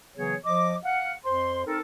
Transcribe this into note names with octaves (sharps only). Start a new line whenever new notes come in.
C#3 E3 F#3 B3 G#4 C#5
F3 D#5 D6
F5 F#5
F2 C5 C6
C4 D#4 A4 A#4